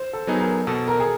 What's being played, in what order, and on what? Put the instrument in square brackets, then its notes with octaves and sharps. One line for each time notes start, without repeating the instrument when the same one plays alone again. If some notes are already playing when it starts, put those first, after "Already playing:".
Already playing: [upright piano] C5
A4
[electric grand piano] F#3 B3 D#4 G#4
[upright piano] A#4
[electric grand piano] B2 [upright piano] A4
[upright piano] A#4
G#4